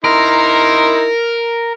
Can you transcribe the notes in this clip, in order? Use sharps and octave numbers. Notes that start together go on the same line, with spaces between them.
D#4 E4 A#4 C6